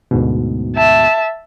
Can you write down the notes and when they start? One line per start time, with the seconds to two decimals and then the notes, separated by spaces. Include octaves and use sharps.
0.11 D2 G#2 B2
0.75 E5 A5